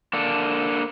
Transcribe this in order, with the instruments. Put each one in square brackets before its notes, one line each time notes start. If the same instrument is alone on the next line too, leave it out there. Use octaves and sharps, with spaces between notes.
[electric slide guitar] A#3 D4 A4